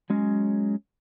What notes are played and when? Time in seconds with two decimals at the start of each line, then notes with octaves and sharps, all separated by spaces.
0.10 F#3 G#3 C#4